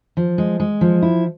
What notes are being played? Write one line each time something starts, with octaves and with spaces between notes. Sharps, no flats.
F3
G#3
G#3
F3
E4